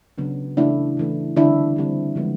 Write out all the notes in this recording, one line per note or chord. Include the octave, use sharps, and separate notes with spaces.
C#3 F#3 B3 D4
C#3 E3 A3 D4 E4
C#3 E3 A3
D3 G3 C4 D4 E4
D3 G3 C4
D3 F3 G#3 B3